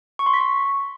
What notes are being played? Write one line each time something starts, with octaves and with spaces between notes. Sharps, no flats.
C#6
C6
B6
C#6